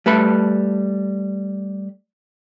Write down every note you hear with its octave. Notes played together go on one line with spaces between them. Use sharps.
G3 A3 B4 A5 B5